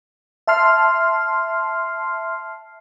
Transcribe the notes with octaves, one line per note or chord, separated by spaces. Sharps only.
E5 A5 C6 F6 C7